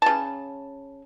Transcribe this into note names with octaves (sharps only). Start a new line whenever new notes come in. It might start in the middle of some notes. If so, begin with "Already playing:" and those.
C#3 A5